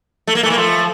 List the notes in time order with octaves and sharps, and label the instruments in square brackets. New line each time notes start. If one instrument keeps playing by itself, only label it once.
[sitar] A3
A#3
A3
[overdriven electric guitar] E3 [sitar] A#3
[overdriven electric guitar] F3 [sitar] A3